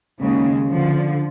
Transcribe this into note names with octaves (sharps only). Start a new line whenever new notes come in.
D#2 C#3 G#3
D3 F3